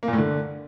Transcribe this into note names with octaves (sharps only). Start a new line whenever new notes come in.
A#3
A#2
A2
D3